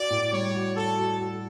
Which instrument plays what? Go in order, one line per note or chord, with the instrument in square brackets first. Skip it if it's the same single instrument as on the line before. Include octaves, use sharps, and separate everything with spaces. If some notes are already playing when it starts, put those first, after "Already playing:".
Already playing: [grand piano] F#4 [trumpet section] D5
[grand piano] A2
[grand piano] G3 [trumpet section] C#5
[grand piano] F#4
[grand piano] F#4 [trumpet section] A4
[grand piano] F#4
F#4